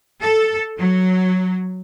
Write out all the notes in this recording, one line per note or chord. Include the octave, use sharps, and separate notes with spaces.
A4
F#3